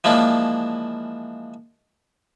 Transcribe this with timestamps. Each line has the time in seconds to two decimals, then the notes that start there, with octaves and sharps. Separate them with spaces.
0.04 E3 F3 G#3 A#3 D4